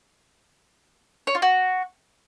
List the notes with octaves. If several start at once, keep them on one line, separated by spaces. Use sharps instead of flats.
C#5
F4
F#4